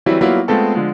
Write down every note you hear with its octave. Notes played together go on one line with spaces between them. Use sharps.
E3 F#3 G3 C4 E4
F#3 G3 A#3 B3 E4 F4
G#3 A3 B3 C4 F4 A4
D3 F3 G#3